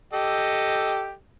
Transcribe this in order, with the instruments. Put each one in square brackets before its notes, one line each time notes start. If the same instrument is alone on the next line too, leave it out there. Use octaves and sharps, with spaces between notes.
[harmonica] G4 A4 D#5